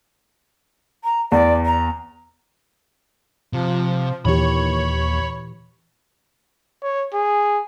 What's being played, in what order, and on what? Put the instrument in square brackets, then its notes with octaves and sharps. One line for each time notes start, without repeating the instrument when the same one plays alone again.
[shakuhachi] A#5
[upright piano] E2 [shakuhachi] D5
[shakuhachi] A#5
[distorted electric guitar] C3 [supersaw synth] F3
[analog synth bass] D#2 [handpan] A#2 E3 G4 [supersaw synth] C#5 [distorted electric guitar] B5
[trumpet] C#5
G#4